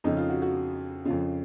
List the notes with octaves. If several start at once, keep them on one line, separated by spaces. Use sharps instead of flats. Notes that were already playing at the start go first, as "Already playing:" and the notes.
F2 C#3 D#4
F4
F#4
F#4
F2 C#3 F4